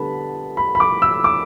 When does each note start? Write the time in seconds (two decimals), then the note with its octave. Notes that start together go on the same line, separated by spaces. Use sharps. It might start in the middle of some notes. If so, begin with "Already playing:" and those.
Already playing: D3 G3 B3 A5 B5
0.57 B5
0.75 B5
0.80 D6
1.02 E6
1.24 D6